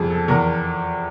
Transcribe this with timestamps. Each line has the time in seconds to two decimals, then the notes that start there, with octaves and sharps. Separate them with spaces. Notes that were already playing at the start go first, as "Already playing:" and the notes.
Already playing: F2 G#4
0.10 A4
0.28 E2 A#4